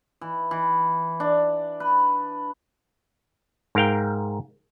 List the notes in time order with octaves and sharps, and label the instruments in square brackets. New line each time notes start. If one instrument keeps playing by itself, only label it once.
[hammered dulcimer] E3
E3
D4
B4
[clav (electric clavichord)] G#2 A#4 F5 G5